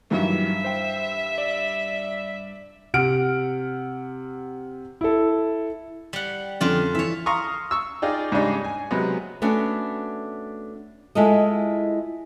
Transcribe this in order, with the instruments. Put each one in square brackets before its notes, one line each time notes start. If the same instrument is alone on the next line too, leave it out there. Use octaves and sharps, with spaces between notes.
[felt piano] G2 [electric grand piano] D#3 E3 F#3 [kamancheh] E5
[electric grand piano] C5 G5
D5
[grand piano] C3 F#5 F6 D7
E4 A4
[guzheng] G3 F#5
[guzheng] F2 F4 D5 [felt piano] D3 F3 C#4
[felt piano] E3 [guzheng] C#5 E5
[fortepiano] F5 A#5 C6 C#6 D#6
C#6 E6
D#4 F4 G#4 D5 G5
G#2 C#3 G3 D4 D#4
G#5
C3 F#3 G#3 B3
[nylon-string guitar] A3 B3 C#4 D4 F#4
G#3 E4 F4 A4 D#5